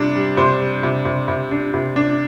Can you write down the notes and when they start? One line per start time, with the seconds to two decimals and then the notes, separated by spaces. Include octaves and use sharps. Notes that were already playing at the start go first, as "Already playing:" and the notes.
Already playing: C3 G3 D4
0.16 G3
0.37 C3 C5
0.60 G3
0.83 C3
1.05 C3
1.28 C3
1.51 D4
1.74 C3
1.96 D4